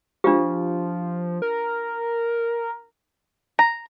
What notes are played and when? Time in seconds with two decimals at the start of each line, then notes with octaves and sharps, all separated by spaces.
0.24 F3 D4 F4 G4
1.42 A#4
3.59 A#5